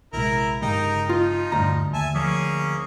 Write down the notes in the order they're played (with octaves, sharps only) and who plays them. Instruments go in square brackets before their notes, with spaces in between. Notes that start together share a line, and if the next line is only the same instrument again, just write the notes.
[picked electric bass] A#1 C3 G#3 [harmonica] E4 A#4
[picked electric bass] G1 C#3 G#3 [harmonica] D#4 G4 A#4
[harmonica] F3 D#4 [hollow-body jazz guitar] F4
[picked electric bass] D#1 G2 [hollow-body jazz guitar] D2 A#5
[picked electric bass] D#2 [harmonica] E5 G#5 A5
[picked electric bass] F3 [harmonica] A#3 C#4 G#4